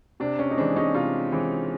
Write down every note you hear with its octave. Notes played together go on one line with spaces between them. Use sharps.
C3 D4
C#4
D#4
E3 G#3 C4 D4
C#4 D#4
C3 D#4 F4
E3 G#3 C4